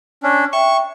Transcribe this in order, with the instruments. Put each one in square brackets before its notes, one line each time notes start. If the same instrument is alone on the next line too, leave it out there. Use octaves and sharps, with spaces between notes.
[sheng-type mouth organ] C#4 D4
[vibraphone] E5 G5 [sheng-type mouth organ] C#6